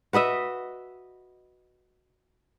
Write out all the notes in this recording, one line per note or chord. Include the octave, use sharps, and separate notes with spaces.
F#4 B4 D#5 E5